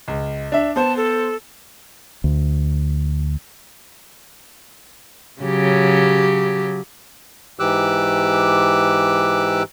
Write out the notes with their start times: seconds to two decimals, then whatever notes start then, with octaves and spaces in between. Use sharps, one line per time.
0.08 C#2
0.52 D4 E5
0.76 B3 C5 A5
0.97 A4
2.24 D2
5.42 C#3 F#3 G4
7.60 G#2 E3 G4 D6 E6 F#6